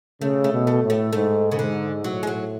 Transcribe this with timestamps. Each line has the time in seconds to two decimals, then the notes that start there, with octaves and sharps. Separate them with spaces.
0.21 C#3 A3
0.44 A3
0.52 B2
0.67 A3
0.82 A2
0.90 A3
1.13 G#2 A3
1.52 C#3
1.59 G#2 D3
2.04 A2 F#3
2.23 G#3
2.27 F#3